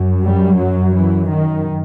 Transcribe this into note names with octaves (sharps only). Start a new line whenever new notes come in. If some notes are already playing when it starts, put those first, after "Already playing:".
Already playing: F#2
G3
F#3
E3
D#3